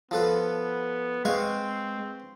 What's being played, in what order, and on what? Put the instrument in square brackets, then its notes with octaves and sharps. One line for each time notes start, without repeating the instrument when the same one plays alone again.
[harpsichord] F3 A4 B4 [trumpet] B3
[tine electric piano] G#3 [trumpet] C4 [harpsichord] B4 F5 C#6